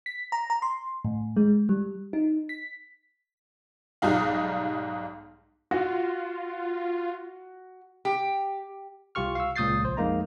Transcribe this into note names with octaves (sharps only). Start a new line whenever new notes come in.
B6
A#5
A#5
C6
A2
G#3
G3
D#4
B6
B1 G#2 G3 D#4 F5
F4 F#4
G4
C2 F4 G4 C#6 F6
F5 C#6 E6
C#2 A#2 D#6 G6 A6 C7
A#1 C5
F2 G#3 A#3 D#4 A#5